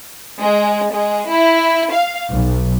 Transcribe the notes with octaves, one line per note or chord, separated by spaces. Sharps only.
G#3
G#3
E4
F5
B1